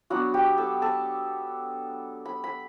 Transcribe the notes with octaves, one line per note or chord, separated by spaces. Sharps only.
F#3 B3 D4 F#4 F#5
G4 G5
A4 A5
A4 A5
B5
B5